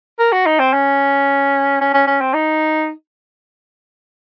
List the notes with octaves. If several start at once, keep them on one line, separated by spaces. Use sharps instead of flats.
A#4
F#4
D#4
C4
C#4
C#4
C#4
C#4
C4
D#4